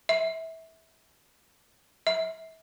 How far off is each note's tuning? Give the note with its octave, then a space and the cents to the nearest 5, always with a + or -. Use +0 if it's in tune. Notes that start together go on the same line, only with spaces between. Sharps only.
E5 -25
E5 -35